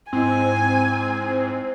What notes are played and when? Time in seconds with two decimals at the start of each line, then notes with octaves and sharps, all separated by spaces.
0.13 G#2 C4 E4 D#5 G#5